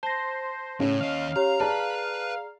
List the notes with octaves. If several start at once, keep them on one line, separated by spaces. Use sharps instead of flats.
C5 A5 A#6
A2 C#3 C#4
D#2 D#5 F5
G4 C#5 A#5
G#4 B4 D5 A5 A#5